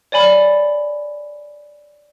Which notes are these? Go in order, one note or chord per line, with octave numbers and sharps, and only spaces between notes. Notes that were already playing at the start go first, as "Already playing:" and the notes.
C#5 D5 G#5 B5